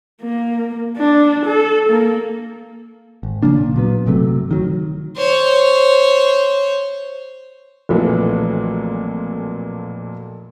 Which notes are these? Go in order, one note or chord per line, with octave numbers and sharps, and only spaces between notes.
A#3
D4
A4
A#3
G#1
C#3 F3 A#3 D4
A#2
A#2 F#3 B3
G1 C3 F#3 A3
D#3 F#3
C5 C#5
B1 F2 A#2 E3 A3 A#3